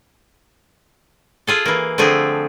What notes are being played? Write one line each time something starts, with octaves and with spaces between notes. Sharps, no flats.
F4 G#4 A4
E3 A#3
D3 F3 A3 C4 G#4